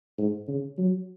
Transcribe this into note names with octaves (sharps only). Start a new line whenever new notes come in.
G#2
C#3
F#3